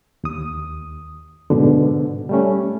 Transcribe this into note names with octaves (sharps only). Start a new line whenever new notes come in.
D#2 D#6
G#2 B2 D3
G3 A3 C#4